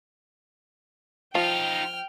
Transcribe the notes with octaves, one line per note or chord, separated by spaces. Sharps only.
F3 D#4 F4 G5 F6